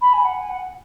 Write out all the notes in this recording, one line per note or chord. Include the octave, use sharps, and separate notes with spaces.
B5
G#5
F#5
G#5
F#5